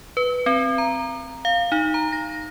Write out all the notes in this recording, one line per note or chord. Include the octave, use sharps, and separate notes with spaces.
B4
C4
A#5
F5
D#4
A#5
A#6